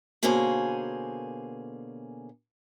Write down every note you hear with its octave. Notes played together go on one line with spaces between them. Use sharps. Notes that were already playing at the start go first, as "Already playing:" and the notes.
B2 D3 A#3 C#4 G#4 C5